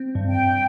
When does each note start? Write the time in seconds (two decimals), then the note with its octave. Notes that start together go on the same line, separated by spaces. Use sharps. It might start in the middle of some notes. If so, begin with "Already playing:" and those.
Already playing: C4
0.15 G2
0.28 G5